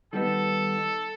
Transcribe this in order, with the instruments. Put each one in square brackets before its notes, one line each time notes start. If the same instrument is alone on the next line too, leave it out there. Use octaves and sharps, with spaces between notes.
[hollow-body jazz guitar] D#3 G3 B3 D#4 [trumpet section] A4